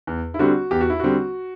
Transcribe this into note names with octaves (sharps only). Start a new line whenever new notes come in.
E2
E4
D3 G3 C4 F#4
E2 G4
F#4
E4
D3 G3 C4 F#4